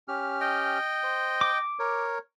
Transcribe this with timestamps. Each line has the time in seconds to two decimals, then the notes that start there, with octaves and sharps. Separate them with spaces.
0.08 C#4 G4 F6
0.41 D#5 G5
1.03 C5
1.41 D6
1.79 A#4 C#5